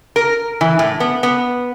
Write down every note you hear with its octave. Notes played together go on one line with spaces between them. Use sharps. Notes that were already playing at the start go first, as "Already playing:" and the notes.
A#4
E3
A2
B3
B3